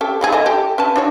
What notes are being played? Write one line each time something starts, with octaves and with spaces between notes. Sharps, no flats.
C#4 G4 A4
C#3 G#3 G#4
E3 A4 D#5
G4 A4
C#4 B4 A5
D4 F#4 C#5